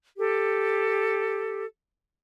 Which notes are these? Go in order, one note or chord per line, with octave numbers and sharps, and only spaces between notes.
G4 A4